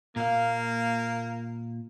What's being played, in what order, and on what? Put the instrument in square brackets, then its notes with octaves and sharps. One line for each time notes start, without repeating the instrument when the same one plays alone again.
[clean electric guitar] A#2 F5 [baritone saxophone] A#3